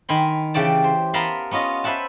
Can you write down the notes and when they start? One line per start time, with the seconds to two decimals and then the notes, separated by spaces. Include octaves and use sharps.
0.09 D#3 G#5 B5 C6
0.54 C#3 E3 G4 D5 A5
0.84 C5
1.14 B3 A#4 F5 A5 B5 C6
1.51 B3 C#4 F4 D#5
1.84 B4 C5 E5 F#5 A5